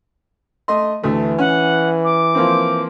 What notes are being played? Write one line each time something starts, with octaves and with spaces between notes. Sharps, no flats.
A3 D#5 C6
D2 E3 A3
C#4 F#5
D6
F3 A#3 C4